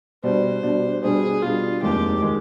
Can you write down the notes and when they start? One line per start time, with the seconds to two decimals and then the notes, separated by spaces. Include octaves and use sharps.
0.23 B2 G3 D4 C5
0.63 B2 G3 D4
1.03 B2 G3 D4 G#4
1.42 B2 G3 D4 F4
1.82 F1 D#2 D#3 G#3 G4
2.22 D#3 G#3